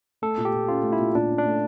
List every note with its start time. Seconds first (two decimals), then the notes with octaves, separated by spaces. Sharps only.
0.22 A3 A4
0.38 A#2
0.45 G4
0.53 A#2
0.68 C#4 F4
0.83 A3
0.92 E4
0.99 A#2
1.15 A#2 D4
1.30 C#4
1.38 D4
1.46 A3